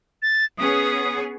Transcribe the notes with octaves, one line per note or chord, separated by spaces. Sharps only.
A6
B3 C#4 G#4 D#6